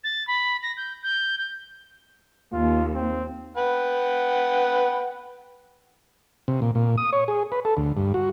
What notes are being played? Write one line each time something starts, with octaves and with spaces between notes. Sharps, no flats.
A6
B5
A#6
G6
G6
G6
D#2 F4
C4
B4 F#5 G5
C3
A#2
A#2
D#6
C#5
G#4
B4
A4
D2
G2
F#4